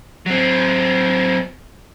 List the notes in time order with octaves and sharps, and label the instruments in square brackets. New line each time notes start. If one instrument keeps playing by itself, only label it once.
[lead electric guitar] F#3 C4